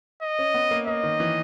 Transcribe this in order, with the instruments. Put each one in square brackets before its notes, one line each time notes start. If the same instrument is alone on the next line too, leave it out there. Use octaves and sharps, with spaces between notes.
[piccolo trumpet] D#5
[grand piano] C#4
B3
A#3
[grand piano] A#3 [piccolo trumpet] D#5
[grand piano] D#3
E3